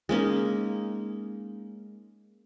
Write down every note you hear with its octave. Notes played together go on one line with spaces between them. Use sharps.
G#3 A#3 C#4 D#4